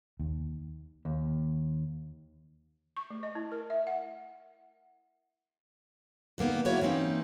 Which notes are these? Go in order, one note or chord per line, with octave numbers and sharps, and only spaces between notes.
D#2
D#2
C#6
A3
D#5
E4
A#4
E5
F#5
G2 D3 A#3 B3 D#4
F#3 A#3 B3 E4 F#4 C#5
E3 A#3 C4 C#4 D#4